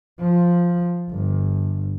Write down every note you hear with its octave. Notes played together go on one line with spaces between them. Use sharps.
F3
G1